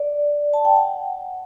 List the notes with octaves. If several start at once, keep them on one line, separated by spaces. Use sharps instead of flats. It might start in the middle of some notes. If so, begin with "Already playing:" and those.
Already playing: D5
A5
G5
F#5